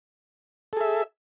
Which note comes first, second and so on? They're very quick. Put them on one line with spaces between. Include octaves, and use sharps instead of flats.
A4 G#4 E5